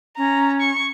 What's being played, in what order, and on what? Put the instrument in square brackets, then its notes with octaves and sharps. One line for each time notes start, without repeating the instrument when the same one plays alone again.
[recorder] C#4 [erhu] A#5
[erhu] C#6